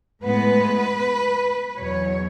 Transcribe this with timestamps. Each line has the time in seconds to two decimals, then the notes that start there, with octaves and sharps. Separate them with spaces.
0.23 A2 G#3 B3 B4
1.78 E2 B2 F#3 C#5